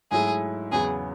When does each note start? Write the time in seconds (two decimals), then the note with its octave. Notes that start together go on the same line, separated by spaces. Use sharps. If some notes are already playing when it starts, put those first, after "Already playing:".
0.11 G#2 F#3 A3 E4 G#4
0.72 E2 C#3 F#3 B3 G#4